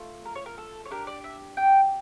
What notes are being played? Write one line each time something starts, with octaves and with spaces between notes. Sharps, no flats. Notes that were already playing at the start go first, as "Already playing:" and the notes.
Already playing: A3 F4
A#4
C#5
A#4
A4
C#5
D4 G4 A#4
D5
E5
G5